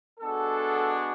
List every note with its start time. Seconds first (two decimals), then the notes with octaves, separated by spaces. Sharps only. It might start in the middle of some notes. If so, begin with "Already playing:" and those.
0.19 G#3 B3 D4 F#4 A4